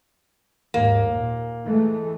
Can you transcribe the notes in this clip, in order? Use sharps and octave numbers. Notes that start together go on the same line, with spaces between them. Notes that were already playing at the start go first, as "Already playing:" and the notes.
D#2 G#2 A#3
A#2
E3 G#3 A3